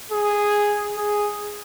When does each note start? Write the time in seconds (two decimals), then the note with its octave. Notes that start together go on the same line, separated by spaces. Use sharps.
0.12 G#4
0.97 G#4